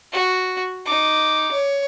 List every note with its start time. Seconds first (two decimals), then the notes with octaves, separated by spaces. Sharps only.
0.12 F#4
0.85 D#4 D6
1.52 C#5